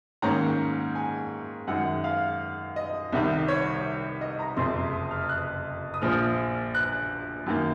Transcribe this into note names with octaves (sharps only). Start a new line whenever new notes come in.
G#2 D#3 A#3 C#4 A#5
G#5
F#2 D#3 G#3 F#5
F5
D#5
C2 C3 D#3
C#5
D#5
A#5
F#1 F2 C3 C6
D#6
F6
F#6
D#6
A#1 A#2 F3 F6
F#6
F#2 D#3 A#3